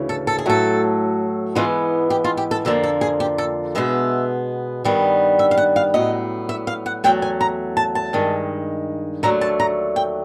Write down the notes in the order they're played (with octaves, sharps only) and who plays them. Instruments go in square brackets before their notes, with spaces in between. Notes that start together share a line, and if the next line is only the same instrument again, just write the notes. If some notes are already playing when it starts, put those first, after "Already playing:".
Already playing: [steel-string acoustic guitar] D2 C#3 E3
A4
A4
G#4
A2 F#3 A3 A4
G#2 E3 G#3 B3 F4
G4
F4
G4
A4
F2 D3 F3 A#3 A4
A4
G#4
G4
A4
B2 G#3 B3 E5
G2 D#3 G3 B3
E5
F5
F#5
F5
A2 F#3 B3 D#5
E5
F5
F#5
E2 C#3 F#3 A3 G5
G#5
A#5
A5
A5
G2 D#3 G#3
D#2 D3 F#3 A3 A#5
A5
A#5
G5